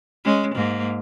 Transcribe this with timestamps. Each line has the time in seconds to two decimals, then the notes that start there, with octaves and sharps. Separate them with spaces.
0.25 G#3 C#4
0.55 G#2 A#3